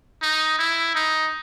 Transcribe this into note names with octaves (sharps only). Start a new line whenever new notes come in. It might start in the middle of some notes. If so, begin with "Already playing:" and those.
D#4
E4
D#4